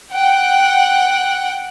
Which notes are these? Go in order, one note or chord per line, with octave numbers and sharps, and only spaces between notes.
F#5 G5